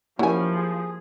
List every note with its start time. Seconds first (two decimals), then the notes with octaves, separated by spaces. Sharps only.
0.19 F3 F#3 A#3 C#4 E4 G4 G#5
0.56 G#4